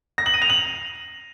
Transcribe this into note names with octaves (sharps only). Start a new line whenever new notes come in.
A#6
F#7
D#7
F7
F#7